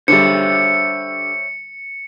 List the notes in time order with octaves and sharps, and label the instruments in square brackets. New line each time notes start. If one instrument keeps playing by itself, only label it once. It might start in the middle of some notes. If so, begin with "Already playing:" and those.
[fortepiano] D3 G3 [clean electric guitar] C5 C#5 E5 [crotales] C#7